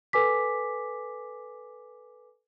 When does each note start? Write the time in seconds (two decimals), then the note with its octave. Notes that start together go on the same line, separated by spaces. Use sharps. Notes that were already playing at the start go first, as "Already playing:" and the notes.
0.13 A4 B4 G#5 D6 B6